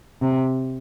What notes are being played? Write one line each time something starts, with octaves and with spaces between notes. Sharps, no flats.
C3